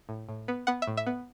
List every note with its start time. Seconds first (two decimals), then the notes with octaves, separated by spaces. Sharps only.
0.09 A2
0.29 A2
0.48 B3
0.67 B3 F#5
0.82 E5
0.87 A2
0.97 E5
1.06 B3